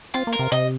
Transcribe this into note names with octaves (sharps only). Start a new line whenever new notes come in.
C4 F4
A#3
A#4
C3
C3 D#5